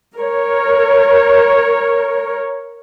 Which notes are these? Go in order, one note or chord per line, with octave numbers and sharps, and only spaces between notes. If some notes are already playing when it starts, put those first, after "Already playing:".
A#4 C#5